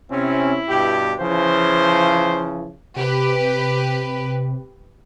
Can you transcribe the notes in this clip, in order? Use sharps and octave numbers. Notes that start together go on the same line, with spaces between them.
C3 C4 C#4 E4
G2 B2 G4
C#3 E3 F3 C5
C3 G4 B4